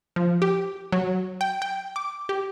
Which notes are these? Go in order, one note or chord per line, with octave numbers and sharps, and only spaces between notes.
F3
G4
F#3
G5
G5
D6
G4